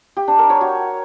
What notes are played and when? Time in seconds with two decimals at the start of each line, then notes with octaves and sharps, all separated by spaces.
0.17 G4
0.28 D4
0.39 A#4
0.50 C#5
0.61 F#4